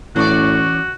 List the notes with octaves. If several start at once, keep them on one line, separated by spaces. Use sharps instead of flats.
A2 E3 C#4 F#4 D5 C#6